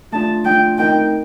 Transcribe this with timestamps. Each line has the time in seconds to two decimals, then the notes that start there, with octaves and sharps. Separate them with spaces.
0.13 A3 D4 F4 A5
0.45 A3 D4 F4 G5
0.78 A3 C4 D#4 A#4 D#5 G5